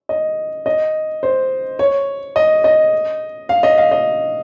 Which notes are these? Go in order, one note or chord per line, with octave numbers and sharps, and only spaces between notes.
D#5
D#5
C5
C#5
D#5
D#5
F5
D#5
F5
D#5